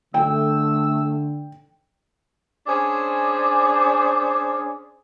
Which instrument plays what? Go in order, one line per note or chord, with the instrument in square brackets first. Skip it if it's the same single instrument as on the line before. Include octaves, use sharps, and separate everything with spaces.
[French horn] D3 [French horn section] A3 [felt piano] G5 [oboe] E6
[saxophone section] C#4 D4 G#4 C5